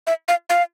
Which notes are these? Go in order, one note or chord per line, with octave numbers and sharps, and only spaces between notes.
E5
F5
F5